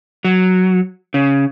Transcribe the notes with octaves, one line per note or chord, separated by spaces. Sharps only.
F#3
C#3